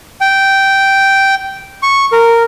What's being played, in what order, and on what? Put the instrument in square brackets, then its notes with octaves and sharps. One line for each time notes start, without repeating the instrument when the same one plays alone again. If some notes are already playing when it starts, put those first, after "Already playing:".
[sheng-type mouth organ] G5
C#6
A#4